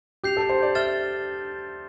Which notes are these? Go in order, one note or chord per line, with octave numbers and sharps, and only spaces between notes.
G4 G6 C7 F7
A4
C5
D5
E5 F6 A6 E7 G7